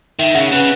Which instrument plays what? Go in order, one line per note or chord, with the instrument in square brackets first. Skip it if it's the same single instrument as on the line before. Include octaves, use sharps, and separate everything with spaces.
[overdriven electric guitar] D#3 [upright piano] E5
[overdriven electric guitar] C#3 [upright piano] F#5
[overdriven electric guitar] C#3 [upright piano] B4